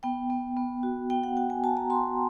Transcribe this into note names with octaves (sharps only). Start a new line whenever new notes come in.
B3 G5
B3
B3
F#4
B3 G5
F#5
F#4 G5
G#5
F#4 A5
A#5
F#4 C6